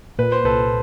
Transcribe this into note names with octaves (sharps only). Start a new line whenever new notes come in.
A#2 B4
C5
C2 A4 B4